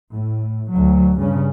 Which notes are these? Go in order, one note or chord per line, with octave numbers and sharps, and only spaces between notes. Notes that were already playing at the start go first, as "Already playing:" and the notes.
A2
D2 F#3
G2 C#3 C#4